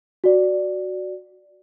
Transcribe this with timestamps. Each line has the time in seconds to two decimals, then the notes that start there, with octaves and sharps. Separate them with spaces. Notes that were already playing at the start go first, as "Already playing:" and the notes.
0.24 F#4 D5